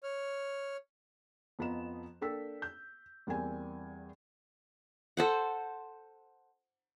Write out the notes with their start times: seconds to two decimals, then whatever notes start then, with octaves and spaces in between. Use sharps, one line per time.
0.03 C#5 F6
1.59 F2 F3 B3 D#5 A#5 E7
2.21 A#3 D4 A4 G5 E6 B6
2.62 G6
3.27 E2 G3 A#3 C4 G#5
5.17 A4 C5 F#5